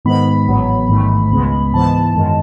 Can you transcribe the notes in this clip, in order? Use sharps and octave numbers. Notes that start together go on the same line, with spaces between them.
G#2 D#3 G#3 B3 B5
A1 A2 F#3 B3
A1 G#2 D#3 A3
C#2 C#3 G#3 B3
G#2 E3 B3 A5
F#2 D#3 G#3